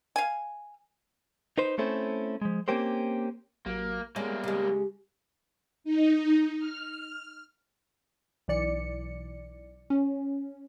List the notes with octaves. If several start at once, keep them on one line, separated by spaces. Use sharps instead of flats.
F5 G#5
D#4 B4 C5
A3 C4 C#4 E4 A4 C5
F3 G#3
A#3 C4 C#4 G4 A#4 C5
A1 F#3 A#3 F#4
G3 G#3 A#3 B3 C#5
C#3 G#3 G4
D#4
F6
B1 E3 D5 C#7
C#4